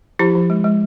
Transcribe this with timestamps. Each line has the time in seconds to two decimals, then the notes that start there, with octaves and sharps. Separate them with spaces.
0.19 F3 E4 G4
0.35 F3
0.50 G#3
0.64 G#3